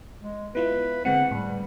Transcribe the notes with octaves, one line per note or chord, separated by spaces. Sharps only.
G#3
B3 E4 F4 B4
D3 G#3 C4 F#5
A2 G3